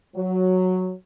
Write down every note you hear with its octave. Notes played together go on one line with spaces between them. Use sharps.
F#3